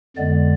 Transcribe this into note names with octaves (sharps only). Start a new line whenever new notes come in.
F2 D3 G#3 B3 D5